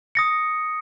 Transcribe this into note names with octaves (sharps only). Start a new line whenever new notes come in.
D#6 A#6 C#7